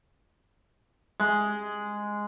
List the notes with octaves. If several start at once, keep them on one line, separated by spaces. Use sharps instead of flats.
G#3